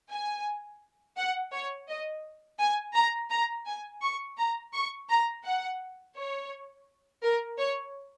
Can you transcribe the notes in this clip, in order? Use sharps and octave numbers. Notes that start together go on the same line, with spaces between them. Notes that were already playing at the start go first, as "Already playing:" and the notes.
G#5
F#5
C#5
D#5
G#5
A#5
A#5
G#5
C#6
A#5
C#6
A#5
F#5
C#5
A#4
C#5